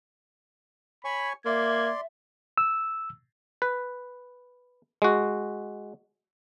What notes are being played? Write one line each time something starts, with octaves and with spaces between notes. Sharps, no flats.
C#5 G#5 B5 C#6
A#3 D5 E5 C6 G#6
E6
B4
G#3 F#4